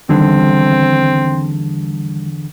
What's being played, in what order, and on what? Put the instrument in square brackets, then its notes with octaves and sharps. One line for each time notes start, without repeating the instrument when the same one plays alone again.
[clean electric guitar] E2 D3 [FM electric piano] D#3 G3 [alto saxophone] C4